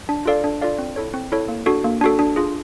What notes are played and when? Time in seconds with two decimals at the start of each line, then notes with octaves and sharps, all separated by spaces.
0.09 D4
0.26 F4 A4 D5 F5
0.44 D4
0.61 F4 A4 D5 F5
0.79 C4
0.96 E4 A4 C#5
1.14 C4
1.32 E4 A4 C#5
1.48 A#3
1.66 D4 F#4 A4
1.84 A#3
2.01 D4 F#4 A4
2.19 D4
2.36 F4 G#4